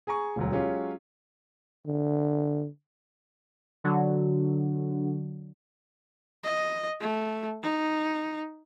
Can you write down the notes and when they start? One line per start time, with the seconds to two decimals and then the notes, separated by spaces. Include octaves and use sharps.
0.07 G#4 G#5 A#5 C#6
0.36 E1 D2 F#3
0.52 F#3 G#3 C#4 F4 G4
1.86 D3
3.84 D3 F#3
6.44 D#5
7.00 A3
7.63 D#4